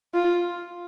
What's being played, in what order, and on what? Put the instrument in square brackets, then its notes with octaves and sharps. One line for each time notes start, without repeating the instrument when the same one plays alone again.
[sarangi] F4